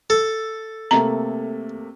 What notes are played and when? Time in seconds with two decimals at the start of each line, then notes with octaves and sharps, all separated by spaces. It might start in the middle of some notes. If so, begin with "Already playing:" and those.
0.10 A4
0.91 C3 A3 A#3 A#5